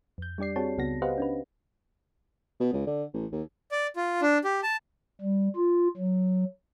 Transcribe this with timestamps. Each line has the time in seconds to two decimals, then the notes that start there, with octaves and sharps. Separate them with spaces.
0.18 F2 G6
0.38 G3 D4 G4 D5 C7
0.56 C4 F#4 G#4 C#5 A5
0.78 C#2 C#3 B3 F#4 A#6
1.02 G4 B4 C5 D#5 F5 F#5
1.18 C#4 D4 B4
2.60 B2
2.73 C#2
2.86 D3
3.14 A1
3.32 D#2
3.71 D5
3.96 F4
4.22 D4
4.44 G4
4.63 A5
5.21 G3
5.56 F4
5.97 F#3